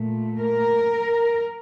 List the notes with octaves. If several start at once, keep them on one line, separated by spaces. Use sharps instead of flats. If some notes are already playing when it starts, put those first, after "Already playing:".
Already playing: A#2 A3
A#4